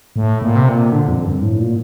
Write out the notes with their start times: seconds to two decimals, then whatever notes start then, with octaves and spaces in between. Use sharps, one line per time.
0.16 A2
0.42 A#2
0.55 C3
0.69 A#2
0.92 D3
1.08 F2
1.25 G2
1.42 A2
1.59 A#2